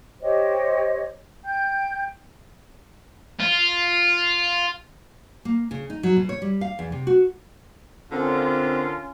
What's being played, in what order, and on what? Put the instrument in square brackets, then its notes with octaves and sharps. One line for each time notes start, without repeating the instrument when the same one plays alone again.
[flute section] G4 C5 C#5 D#5
G5 G6
[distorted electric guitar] F4
[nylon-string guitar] A#3
C#3
D#4
F#3
B2
C#5
G3
F5
E2
C3
F#4
[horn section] D3 A#4 [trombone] C4 [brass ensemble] C#4 F4